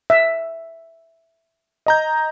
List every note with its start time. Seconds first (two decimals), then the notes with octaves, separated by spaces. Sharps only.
0.10 E5
1.86 D#5 A#5 G6